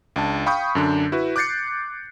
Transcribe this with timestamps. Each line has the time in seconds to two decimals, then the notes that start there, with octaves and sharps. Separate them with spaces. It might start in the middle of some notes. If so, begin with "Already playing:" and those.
0.16 C#2 D4 A5
0.46 F5 G5 B5 C#6 D#6 G6
0.75 F#2 D3 D4
1.12 E4 F#4 B4
1.36 D6 F#6 G6 A6 C7 C#7